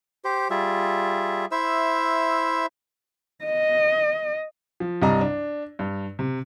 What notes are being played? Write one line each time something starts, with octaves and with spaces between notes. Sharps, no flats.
G4 C5
G3 F4 G#4 E5
E4 C5 E5 E6
D#5
F3
C2 G2 G3 D5 D#5 A#5
D4
G2
C3